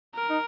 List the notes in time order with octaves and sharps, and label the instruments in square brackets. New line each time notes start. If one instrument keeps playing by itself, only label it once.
[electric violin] A#4
[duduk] D#4